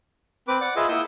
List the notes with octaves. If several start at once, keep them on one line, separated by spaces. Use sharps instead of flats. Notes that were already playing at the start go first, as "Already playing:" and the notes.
C4 B4 D6
D5 F#5 D6
F4 G#4 B4 D#5 E5
A#3 E4 D#6 E6 G6